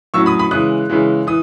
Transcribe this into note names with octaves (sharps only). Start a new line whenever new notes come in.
A2 F#3 C#4 C#6 E6
B5 D#6
B5 D#6
C#3 E3 G#3 D#6 F#6
C#3 E3 G#3
E3 D#6